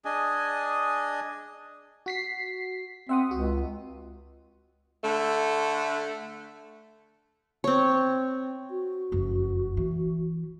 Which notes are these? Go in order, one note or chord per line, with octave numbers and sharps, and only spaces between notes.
D4 G#4 D#5 G#5
F#4 B6 C7
C4 E5 F#5 D#6
C#2 F#4
D3 A3
C4 C#5
F#4
F#1 F2
E3